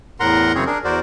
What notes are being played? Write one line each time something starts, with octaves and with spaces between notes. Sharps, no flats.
E2 A2 A#4 F#5 A#5 C6
F#2 C#3 C4 G#4 C#5
D4 G#4 A#4
E2 F#4 A#4 C5 D5